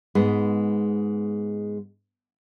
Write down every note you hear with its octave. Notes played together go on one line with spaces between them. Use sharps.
G#2 G#3 B3